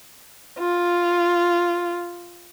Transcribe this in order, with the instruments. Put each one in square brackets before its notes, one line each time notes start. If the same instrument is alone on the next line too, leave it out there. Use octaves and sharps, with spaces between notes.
[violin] F4